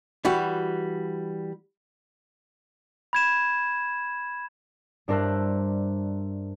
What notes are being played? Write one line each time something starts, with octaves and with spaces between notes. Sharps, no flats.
E3 G3 F#4
B5 G#6 E7
G2 D4 A#4 C5 E5 F#6